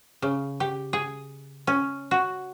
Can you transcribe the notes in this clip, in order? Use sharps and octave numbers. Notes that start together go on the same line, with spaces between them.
C#3
G4
G#4
C#4
F#4